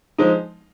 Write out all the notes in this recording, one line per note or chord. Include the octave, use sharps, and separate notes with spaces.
F3 G#3 D#4